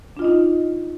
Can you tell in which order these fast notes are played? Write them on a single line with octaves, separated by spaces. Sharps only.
D4 F4 D#5 D#4